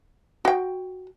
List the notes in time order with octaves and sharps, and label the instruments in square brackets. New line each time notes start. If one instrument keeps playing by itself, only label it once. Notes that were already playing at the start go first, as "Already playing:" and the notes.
[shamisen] F#4 G5